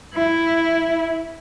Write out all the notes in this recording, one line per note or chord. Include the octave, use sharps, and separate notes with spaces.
E4